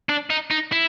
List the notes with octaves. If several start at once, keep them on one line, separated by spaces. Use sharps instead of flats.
D4
D#4
D#4
E4